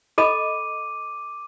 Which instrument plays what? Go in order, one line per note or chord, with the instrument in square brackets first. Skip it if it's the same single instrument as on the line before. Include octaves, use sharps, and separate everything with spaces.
[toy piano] A4 D#5 B5 [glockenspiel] D6 D#7